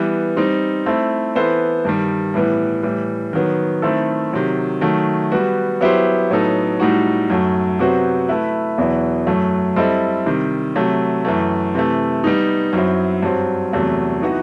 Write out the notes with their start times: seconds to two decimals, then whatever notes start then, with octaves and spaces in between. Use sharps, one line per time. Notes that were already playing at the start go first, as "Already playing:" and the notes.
Already playing: E3 G3 B3
0.37 G3 C4 D#4
0.86 A3 C4 E4
1.35 E3 B3 E4 A4 C5
1.85 G2 D#3 G3
2.34 A2 E3 G3 B3
2.83 A2 E3 G3
3.33 D#3 F#3 B3
3.82 D#3 A3 C4 E4 A4
4.33 C3 D#3 F#3
4.81 D#3 F#3 A3
5.32 G3 B3 F#4
5.81 F#3 B3 E4 G4 C5
6.30 A2 F#3 B3 D#4 A4
6.80 A2 G3 D#4 F#4
7.30 F#2 F#3 A3
7.79 C3 F#3 B3 F#4 C5
8.29 A3 E4 B4
8.78 E2 B2 F#3 B3 E4
9.27 F#2 F#3 A3
9.76 G3 C4 E4 A4 D#5
10.26 C3 D#3 G3
10.75 C3 F#3 A3
11.25 F#2 E3 A3
11.75 C3 E3 A3
12.24 G3 B3 D#4
12.73 F#2 F#3 C4 E4
13.23 G2 F#3 C4
13.73 E2 C3 F#3 A3
14.22 E3 B3 D#4 F#4